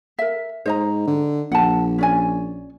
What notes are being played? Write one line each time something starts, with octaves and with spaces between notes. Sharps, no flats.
A#4 E5
G#2 C5 D#5 A#5
D3
A#1 F#5 A5
C#4 D5 G#5